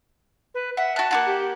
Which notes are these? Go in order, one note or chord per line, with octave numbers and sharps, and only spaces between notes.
B4
E5 F#5
F#4 A5 F#6
A#3 F4 F#5
G4